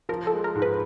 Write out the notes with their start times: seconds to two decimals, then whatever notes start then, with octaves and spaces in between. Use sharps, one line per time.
0.09 F3 A#4
0.27 A4
0.33 G#3
0.44 A#4
0.55 G#2
0.62 B4